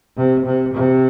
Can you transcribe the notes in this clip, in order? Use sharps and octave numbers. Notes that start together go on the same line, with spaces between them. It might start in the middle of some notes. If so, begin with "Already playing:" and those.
C3
C3
C3